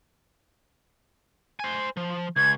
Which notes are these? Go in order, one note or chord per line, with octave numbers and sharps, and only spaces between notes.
C5 G#5
F3
C#2 G#6